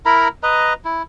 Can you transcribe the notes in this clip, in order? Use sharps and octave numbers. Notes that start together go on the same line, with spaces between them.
E4 A#4 A#5 B5
B4 D#5 A#5
E4